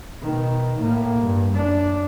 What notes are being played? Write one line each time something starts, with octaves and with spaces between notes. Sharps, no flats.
B2 D#3
A2 A#3
G2
F#2 D4